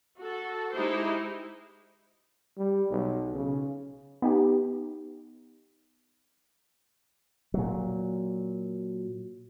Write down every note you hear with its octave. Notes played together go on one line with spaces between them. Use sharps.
F#4 A4
G#3 D#4 E4 G4 C5
G3
B1
C#3
B3 D#4 G4
A#2 F#3